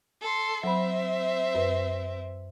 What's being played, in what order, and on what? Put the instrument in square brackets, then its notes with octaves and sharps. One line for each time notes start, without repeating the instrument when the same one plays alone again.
[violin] A4 C6
[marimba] F#3 B5 [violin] C4 E5
[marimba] F#2 B4